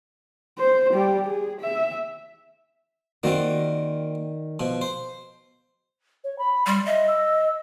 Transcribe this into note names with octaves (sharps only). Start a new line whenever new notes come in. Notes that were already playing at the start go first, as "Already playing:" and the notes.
C5
G3 G4
G#4
E5
D#3 A#3 C4 F4 F#4 D5
B2 F3
C5
C#5
B5
G3 C6
D#5 E5
E6